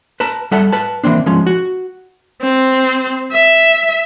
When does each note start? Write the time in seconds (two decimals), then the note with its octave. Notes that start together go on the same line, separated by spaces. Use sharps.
0.20 B4 A5 A#5
0.51 G3 A4 E5 F#5 A5
0.73 B4 A5
1.04 E3 G#3 A#3 C4 D4
1.26 F3 G#3 C#4
1.47 F#4
2.42 C4
3.32 E5